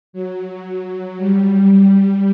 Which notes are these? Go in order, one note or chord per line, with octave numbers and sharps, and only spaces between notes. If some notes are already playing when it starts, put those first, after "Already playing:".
F#3
G3